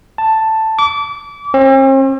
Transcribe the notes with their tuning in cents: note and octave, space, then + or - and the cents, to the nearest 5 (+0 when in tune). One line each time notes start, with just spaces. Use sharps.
A5 +5
D6 -30
C4 +45